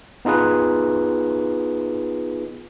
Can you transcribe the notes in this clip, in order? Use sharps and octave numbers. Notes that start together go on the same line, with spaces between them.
B3 D#4 F4 G#4 B4